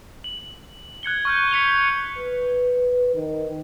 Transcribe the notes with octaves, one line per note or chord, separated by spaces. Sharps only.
F#7
F#6 G#6 C#7 G7
C#6 F6 G6
B6 C#7 F7 G7
B4
D#3